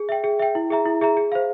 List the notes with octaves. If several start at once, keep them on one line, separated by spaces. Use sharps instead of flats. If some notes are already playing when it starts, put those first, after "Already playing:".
Already playing: G#4
E5 G5
G#4
E5 G5
E4
G#4 E5 A#5
E4
G#4 E5 A#5
G#4
C5 F5